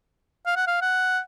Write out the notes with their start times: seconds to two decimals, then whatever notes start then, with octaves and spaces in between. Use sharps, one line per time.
0.46 F5
0.56 F#5
0.67 F5
0.82 F#5